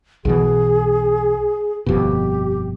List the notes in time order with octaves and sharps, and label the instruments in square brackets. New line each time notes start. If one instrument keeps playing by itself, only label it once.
[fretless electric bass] B1 B2 E3 [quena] G#4
[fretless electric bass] G1 F2 B2 [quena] G4